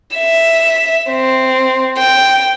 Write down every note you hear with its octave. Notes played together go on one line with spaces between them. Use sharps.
E5
C4
G5